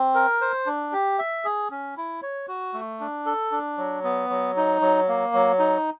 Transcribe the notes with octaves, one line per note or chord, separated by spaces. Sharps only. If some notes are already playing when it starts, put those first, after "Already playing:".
Already playing: C4
A#4
C5
D4
G4
E5
G#4
C#4
E4
C#5
F#4
A3
D4
A4
D4
F#3
B3
F#3
D#4
F#3
A#3
F#3
D#4